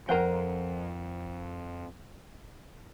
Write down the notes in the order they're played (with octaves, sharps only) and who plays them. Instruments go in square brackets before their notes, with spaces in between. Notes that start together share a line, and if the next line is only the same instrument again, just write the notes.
[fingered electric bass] F2 F3 [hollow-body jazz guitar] A#4 G5 [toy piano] C5 F#5 A#5